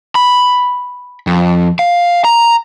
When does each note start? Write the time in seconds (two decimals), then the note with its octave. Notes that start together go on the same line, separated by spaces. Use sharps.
0.15 B5
1.27 F2
1.79 F5
2.24 A#5